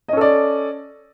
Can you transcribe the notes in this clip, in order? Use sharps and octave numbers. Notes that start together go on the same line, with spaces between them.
C#4 A4 D5 D#5